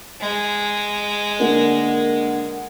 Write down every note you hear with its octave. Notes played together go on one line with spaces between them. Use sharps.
G#3
D3 A#3 D4 A#4 F#5